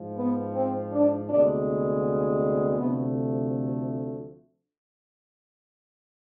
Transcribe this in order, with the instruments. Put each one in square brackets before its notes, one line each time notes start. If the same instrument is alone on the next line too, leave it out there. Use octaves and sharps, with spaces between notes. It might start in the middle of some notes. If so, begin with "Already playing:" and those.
Already playing: [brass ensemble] G#2 F3
B3
C4
D4
D2 C3 G#3 B3 D4
D2 C3 F3 A3 B3